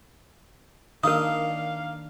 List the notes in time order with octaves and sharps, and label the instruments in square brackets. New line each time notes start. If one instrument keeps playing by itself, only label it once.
[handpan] D#3 D4 [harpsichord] A#3 D#4 [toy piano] A#4 D#6 [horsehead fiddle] F5